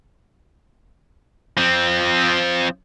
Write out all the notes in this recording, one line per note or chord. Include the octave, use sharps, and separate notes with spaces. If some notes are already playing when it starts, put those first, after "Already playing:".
F3 C4